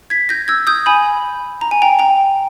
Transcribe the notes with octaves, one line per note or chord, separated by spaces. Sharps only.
G#6 B6
G6 A#6
E6 G#6
D#6 G6
G#5 B5
A#5
G#5
G5 A#5
G5 A#5